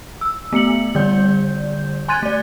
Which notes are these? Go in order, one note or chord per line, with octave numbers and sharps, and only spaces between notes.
E6
A3 B3 C#7 F#7
D3 G3 D5 G6
G#5 C6 F#6 G#6 A6 D#7
A3 D5